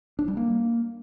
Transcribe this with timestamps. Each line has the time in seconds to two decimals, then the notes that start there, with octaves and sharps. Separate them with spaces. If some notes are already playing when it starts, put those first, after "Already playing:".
0.19 D4
0.28 G3
0.37 A#3